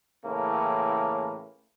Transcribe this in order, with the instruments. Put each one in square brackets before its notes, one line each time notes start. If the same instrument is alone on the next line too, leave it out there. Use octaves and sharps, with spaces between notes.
[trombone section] A2 C#3 E3 A#3